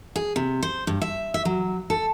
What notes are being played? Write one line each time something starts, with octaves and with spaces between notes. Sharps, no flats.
G#4
C3
C5
G2
E5
E5
F#3
A4